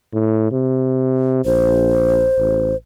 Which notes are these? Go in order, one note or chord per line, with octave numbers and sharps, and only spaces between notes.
A2
C3
A#1 C5
A1